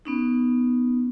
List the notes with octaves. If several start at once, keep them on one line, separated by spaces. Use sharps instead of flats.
B3 C#4 D#4